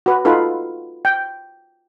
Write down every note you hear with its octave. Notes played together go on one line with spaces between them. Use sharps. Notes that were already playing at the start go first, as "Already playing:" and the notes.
F#4 B4
D#4 F4 A4 B4
G5